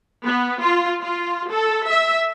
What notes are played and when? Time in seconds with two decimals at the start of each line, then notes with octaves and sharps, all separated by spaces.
0.24 B3
0.62 F4
1.03 F4
1.51 A4
1.88 E5